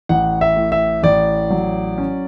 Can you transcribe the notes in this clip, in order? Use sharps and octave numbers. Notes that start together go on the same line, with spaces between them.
A1 F#5
E5
A2
E5
A1 D5
F#3
C#4